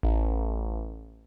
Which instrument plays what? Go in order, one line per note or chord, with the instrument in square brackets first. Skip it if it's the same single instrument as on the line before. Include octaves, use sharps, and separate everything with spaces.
[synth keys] A1